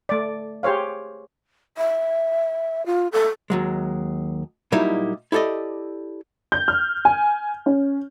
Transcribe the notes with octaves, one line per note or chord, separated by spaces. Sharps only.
A3 D5
G4 G#4 C5 C#5 F5
E5
F4
A4
D#2 F#3 G#3
A#2 F#3 G3 A#3 D#4 E4
E4 G4 A4 D5 D#5
G6
F6
G#5
C#4